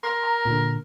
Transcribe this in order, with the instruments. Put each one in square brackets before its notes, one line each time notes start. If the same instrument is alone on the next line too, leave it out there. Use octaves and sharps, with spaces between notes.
[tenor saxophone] A#4 [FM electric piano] C6
[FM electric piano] A#5
A#2 D3